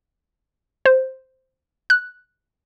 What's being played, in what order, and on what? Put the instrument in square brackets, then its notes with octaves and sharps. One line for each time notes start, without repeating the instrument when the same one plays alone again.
[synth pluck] C5
F#6